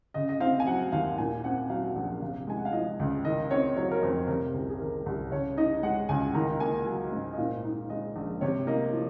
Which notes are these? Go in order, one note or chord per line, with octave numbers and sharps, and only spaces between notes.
C#3 D#5
D#5
C4 F5
G#5
F#3 F#5
D#2 F5
A#2 G#5
C4 F#5
F#3 F5
A#1 F#5
C3 F5
G#3 G#5
F#5
F5
F3 D#5
C#2
D#3 D#5
C4 C#5
F#3 C#5
A#4
F2 C5
C3 A#4
C2 G#4
G#4
D#3 A#4
C2
C#3 C#5
D#4 D#5
G#3 F#5
C#2 G#5
D#3 A#5
A#3 G#5
F#3 G#5
G#2
D#5
A#2 F5
D#4
G#3 D#5
A#1
C3 C#5
A#3 D#5
F3